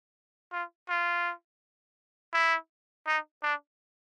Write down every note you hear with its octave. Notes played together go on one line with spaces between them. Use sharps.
F4
F4
E4
D#4
D4